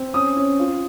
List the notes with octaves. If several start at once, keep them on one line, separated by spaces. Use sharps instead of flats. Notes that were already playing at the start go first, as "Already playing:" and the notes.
Already playing: C4
C#4 D#6
C#4
F4